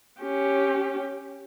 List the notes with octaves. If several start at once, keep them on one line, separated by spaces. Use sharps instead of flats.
C#4 G4